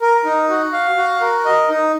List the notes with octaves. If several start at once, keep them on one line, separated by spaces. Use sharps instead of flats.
A#4
D#4
F#4
F5
F#4
A#4
D#5
D#4